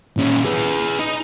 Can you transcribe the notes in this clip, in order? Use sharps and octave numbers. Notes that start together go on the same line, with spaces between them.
A#2 C#4
G#4 B4
D#4